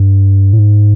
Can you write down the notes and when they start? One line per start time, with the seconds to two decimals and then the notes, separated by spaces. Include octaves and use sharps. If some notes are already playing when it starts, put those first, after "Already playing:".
Already playing: G2
0.53 A2
0.59 G#2